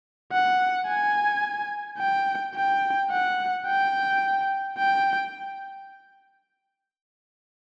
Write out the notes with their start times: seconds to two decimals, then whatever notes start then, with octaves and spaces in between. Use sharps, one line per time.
0.32 F#5
0.87 G#5
1.98 G5
2.55 G5
3.10 F#5
3.66 G5
4.77 G5